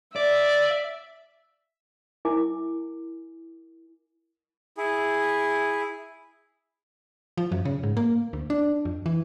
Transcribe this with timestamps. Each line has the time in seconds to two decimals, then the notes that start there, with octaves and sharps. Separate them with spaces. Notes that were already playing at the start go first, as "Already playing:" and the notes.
0.16 D5 E5
2.25 E4 A#4 E5 G#5 D6
4.78 E4 G#4
7.37 F3
7.52 F#2
7.65 C#3
7.83 G#2
7.97 A#3
8.33 D2
8.50 D4
8.85 F2
9.06 E3